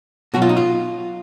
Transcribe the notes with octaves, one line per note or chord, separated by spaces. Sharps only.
B2 F#3 F#4
F4
D#4
F4